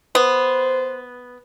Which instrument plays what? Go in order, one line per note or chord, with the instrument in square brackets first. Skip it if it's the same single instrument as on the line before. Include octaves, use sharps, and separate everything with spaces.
[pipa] B3 [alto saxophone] C5